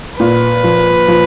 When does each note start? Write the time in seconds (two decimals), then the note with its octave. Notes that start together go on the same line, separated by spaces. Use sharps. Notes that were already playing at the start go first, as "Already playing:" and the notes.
0.19 A#2 B4
0.64 F3
1.08 F3